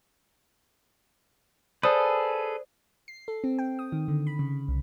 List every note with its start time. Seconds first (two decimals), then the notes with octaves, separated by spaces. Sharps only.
1.83 G#4 A4 B4 C5 D5 D#6
3.08 C7
3.28 A4
3.44 C4
3.59 G5
3.79 D#6
3.92 D#3
4.08 D3
4.27 B5
4.39 C#3
4.68 C2